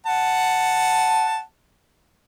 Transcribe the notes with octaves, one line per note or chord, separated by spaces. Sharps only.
F#5 A5